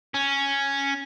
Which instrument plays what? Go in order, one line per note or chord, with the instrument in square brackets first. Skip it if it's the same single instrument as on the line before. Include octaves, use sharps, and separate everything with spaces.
[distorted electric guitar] C#4